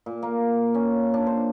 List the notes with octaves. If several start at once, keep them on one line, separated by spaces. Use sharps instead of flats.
A#2
A#3
C#4
D4
C5